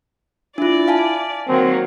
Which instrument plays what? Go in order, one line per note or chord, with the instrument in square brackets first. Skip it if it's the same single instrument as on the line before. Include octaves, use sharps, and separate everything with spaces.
[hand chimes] D4 F4 [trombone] E4 [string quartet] D5
[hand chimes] F5 G#5 A5
[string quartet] D#3 F#3 A#3 [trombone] C4